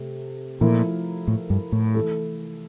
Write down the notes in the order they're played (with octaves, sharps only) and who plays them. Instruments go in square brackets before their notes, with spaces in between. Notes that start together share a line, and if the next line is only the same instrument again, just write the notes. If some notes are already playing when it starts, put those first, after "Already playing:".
Already playing: [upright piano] C3 A3
[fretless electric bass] A#2 [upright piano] F3 A3 E4 A#4
[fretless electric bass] A2
G2
A2
[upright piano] E3 A3 E4 A4